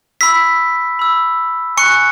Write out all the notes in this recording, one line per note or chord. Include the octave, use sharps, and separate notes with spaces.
B5 E6 B6
B5 E6
G#5 C#6 F#6 C#7